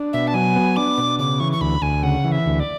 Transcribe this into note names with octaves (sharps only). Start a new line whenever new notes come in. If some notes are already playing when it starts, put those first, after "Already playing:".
Already playing: D4
B2 E5
A5
F#3 G#5
B3
D4 D6
B2
C#3 D6
E3 C#6
C#6
D2 B5
D2 G#5
C#3 F#5
E3
E5
D2
D5